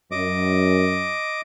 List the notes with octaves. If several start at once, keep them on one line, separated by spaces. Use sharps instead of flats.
F#2 D#5 D6